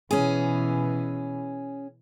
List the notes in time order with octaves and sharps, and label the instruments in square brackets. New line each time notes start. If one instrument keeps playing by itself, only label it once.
[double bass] B2 E3 [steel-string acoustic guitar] C#4 G#4